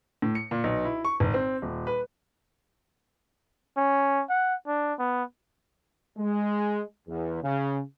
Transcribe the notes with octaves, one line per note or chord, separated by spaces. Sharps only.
A2
C#7
A#2
B1
E4
C#6
G#1
C4
D#1
B4
C#4
F#5
D4
B3
G#3
E2
C#3